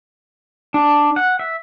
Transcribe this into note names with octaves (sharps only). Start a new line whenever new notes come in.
D4
F#5
E5